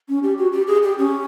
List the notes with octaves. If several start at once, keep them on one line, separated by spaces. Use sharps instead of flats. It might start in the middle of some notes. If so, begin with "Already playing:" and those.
C#4
G4
F#4
G4
G#4
G4
C#4